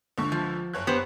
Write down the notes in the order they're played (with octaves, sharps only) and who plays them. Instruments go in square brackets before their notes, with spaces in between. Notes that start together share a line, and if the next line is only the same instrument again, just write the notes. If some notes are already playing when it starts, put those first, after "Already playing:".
[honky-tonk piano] C#2 D3 C#6
[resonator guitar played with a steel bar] F3
[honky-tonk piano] F#1 C#5 F#6
[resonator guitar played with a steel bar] B3 G4 C5